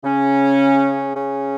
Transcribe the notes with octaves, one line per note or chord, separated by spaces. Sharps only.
C#3 C#4
C#3 C#4